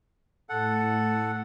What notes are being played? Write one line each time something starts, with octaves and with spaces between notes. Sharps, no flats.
A2 A4 F#5